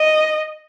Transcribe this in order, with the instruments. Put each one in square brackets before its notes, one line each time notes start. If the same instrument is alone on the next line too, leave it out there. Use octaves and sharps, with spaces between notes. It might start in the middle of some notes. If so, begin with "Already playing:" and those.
Already playing: [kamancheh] D#5